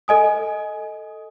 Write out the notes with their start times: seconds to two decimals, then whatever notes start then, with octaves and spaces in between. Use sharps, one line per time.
0.08 A4 D#5 G#5 D#6